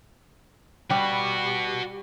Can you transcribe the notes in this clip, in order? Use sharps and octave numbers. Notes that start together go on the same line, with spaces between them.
G3 F#4 B4